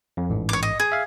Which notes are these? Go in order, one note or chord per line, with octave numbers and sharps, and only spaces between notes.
F2
A1 G#2
C#5 D6
D#5
G#4
E5 F5